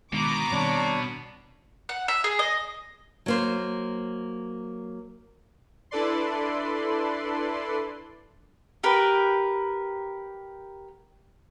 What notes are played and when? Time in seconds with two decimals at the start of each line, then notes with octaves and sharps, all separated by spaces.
0.13 B2 D#3 G#3 D4 A#5 D6
0.51 D#3 G3 C4 D4 C#5
1.89 F#5
2.08 E5
2.24 G#4
2.39 D#5
3.26 F#3 A#3 C5
5.91 D4 E4 A4 B4 D5 C6
8.83 G4 A#4 B4